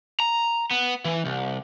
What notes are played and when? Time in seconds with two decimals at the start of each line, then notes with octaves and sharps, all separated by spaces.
0.20 A#5
0.71 B3
1.05 E3
1.25 C2